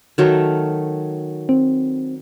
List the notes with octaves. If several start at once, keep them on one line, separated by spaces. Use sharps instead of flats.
D#3 F#3 A3
C4